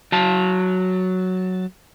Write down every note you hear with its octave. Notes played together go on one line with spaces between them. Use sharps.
F#3 A5